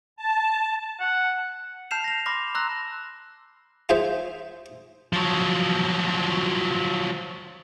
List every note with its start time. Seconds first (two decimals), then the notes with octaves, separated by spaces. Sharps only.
0.16 A5
1.00 F#5
1.91 A5 F6 G6 C7 E7 F7
2.04 A#6 F7
2.26 B5 C6 D6 F6 A#6 F7
2.55 A#5 C6 E6 F#6 A#6
3.89 F4 G#4 C5 E5
5.13 F3 F#3